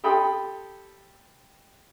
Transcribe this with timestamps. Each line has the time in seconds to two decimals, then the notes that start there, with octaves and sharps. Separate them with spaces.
0.04 G4 A4 G5 B5 C6 D#6